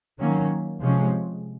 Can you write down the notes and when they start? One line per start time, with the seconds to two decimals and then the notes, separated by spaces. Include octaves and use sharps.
0.20 D#3 F#3 A#3 C#4
0.82 C3 F3 G#3 C#4